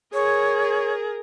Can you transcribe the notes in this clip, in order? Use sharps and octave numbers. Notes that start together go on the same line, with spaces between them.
G#4 A#4 C#5